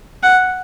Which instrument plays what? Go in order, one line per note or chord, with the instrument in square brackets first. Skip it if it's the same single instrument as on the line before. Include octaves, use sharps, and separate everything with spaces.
[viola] F#5